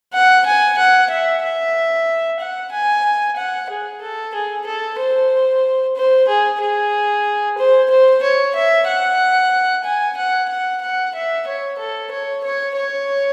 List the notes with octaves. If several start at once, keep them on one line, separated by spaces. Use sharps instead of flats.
F#5
G#5
F#5
E5
E5
F#5
G#5
F#5
G#4
A4
G#4
A4
C5
C5
G#4
G#4
C5
C5
C#5
E5
F#5
G#5
F#5
F#5
F#5
E5
C#5
A4
C#5
C#5
C#5